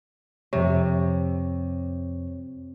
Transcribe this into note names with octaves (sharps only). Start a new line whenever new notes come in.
F2 C3 C#5